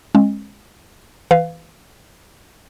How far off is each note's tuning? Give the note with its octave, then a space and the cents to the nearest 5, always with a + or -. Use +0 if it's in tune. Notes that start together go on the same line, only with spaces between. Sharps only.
G#3 +0 C#4 -30
E3 -10 B4 +25 F5 +0